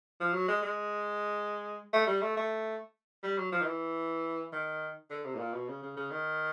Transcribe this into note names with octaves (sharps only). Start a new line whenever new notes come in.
F3
F#3
G#3
G#3
A3
G3
A3
A3
G3
F#3
F3
D#3
E3
D#3
D3
C3
A2
A#2
B2
C#3
C#3
C#3
D#3